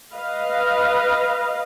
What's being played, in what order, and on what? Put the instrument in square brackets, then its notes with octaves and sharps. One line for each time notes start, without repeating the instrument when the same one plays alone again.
[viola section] B4 D#5 F5